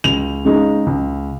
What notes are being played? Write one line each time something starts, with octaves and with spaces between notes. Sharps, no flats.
C#2 F7
C#3 G#3 D#4
C#2